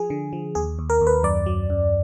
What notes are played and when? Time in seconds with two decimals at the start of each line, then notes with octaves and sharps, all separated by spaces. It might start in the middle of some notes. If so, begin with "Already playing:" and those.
Already playing: F3 G#4
0.10 D3
0.33 F3
0.55 D#2 G#4
0.79 D#2
0.90 A#4
1.01 D#2
1.07 B4
1.23 F#2 D5
1.46 F#3
1.70 F#2